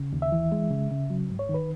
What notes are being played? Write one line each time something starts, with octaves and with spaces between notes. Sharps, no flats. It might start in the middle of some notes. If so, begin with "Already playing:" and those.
Already playing: C#3
D#2
E5
E3
G#3
C#3
C#3
F#3
G#2
C#5
D#3
B4